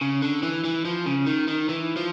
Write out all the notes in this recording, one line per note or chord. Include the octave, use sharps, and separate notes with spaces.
C#3
D3
E3
E3
F3
C#3
D#3
D#3
E3
F3